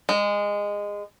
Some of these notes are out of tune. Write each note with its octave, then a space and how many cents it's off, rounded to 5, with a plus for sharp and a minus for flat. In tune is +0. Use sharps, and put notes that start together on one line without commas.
G#3 -20